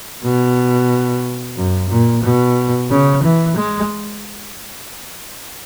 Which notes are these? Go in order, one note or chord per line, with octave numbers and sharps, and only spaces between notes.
B2
F#2
A#2
B2
C#3
E3
G#3